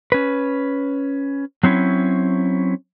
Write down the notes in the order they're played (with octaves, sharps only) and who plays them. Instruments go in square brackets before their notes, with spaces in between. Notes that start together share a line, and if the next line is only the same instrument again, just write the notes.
[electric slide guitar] C#4 B4
F#3 C4 C#4 E4